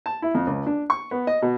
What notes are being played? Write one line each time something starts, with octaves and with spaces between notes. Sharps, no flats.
A5
E4
F2
C#2
D4
C#6
B3
D#5
B2